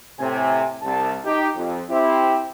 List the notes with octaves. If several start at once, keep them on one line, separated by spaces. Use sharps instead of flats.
A2 C3 G#5
C2 A5
D#4 G4
F2
C4 E4 G4